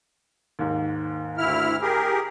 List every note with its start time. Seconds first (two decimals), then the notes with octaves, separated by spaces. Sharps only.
0.59 D#2 G#2
1.38 D2 E4 F6
1.81 G4 G#4 A#4